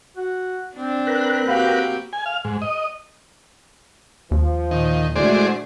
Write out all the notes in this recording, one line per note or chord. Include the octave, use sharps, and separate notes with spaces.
F#4
C4 D4
A#4 B4 F#6
A#3 F#4 G4 F5 F#5 B5
G#5
F5
G#2
D#5
D#2 F3
A#2 D#3
D3 G#3 A3 E4 F#4 C5 D5